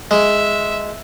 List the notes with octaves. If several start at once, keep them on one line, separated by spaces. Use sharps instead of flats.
G#3 E5